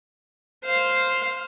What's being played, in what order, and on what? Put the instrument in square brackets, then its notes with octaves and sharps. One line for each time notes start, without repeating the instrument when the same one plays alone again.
[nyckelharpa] C5 F5